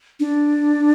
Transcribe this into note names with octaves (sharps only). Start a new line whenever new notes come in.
D4